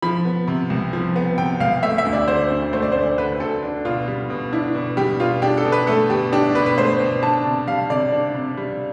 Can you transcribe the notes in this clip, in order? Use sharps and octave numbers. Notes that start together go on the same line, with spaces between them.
F3 B5
B3
C3
C2
F3
B3
C3 G5
C2 F5
A3 E5
E5
D2
D5
D3 C5
D2
A3 C5
D5
D2 C5
D3 B4
D2 A4
D4
B2 F4
G3
B2
D4 E4
B2
G3 G4
B2 F4
D4 G4
A4
B2
B4
A3 A4
B2 G4
D4 G4
B2 B4
B4
A3 C5
B2
D4 A5
C3
G3 F5
C3 D5
D4
C3
G3